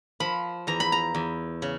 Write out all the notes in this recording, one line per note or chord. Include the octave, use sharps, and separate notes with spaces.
F3 B5
E2 A#5
B5
A#5
E2
C#3